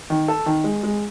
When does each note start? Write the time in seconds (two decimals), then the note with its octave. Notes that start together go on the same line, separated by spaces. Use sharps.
0.10 D#3
0.28 A4
0.46 D#3
0.64 G#3
0.83 G#3